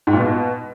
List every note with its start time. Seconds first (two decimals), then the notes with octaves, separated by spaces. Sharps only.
0.07 G#2
0.13 A#2
0.19 B2